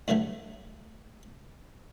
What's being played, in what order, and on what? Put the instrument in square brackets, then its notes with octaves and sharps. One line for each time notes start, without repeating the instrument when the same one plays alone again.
[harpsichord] A2 D3 E3 F#3 G3 A3